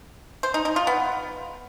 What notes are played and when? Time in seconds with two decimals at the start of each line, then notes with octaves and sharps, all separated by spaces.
0.43 C5
0.54 D#4
0.65 D#4
0.76 F4
0.87 B3